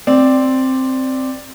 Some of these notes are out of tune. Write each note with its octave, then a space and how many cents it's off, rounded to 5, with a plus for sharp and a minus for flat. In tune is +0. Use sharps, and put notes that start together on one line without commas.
C4 +0 D5 +0